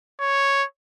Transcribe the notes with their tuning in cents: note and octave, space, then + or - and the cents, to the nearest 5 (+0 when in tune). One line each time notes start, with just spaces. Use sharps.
C#5 +0